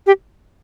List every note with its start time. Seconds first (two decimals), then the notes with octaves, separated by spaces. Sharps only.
0.07 G4